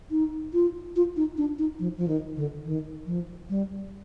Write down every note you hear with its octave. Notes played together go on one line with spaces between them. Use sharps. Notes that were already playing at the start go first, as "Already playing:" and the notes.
D#4
F4
F4
D#4
D4
D#4
F3
F3
D#3
D3
D#3
F3
G3